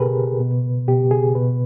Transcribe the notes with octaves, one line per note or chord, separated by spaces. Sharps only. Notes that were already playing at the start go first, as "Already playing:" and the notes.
Already playing: B2 G4 G#4 A#4 B4
B2
B2 G4
G#4
B2 B4